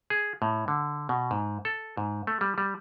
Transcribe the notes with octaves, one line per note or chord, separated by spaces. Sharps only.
G#4
A2
D3
B2
G#2
A4
G#2
A3
G3
G3